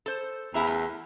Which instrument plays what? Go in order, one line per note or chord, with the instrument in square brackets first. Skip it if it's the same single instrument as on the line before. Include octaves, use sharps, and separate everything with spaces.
[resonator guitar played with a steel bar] A4 C5
[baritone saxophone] E2 [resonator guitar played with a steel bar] E4 E5 A#5
[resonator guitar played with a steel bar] A3